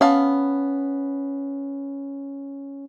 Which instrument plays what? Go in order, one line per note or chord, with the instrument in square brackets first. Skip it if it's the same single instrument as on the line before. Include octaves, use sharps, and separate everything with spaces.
[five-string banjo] B3 F5 A5 [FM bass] C#4